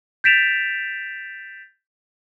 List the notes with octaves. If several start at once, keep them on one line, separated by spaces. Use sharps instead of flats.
G6 A6 B6 D7 E7 F7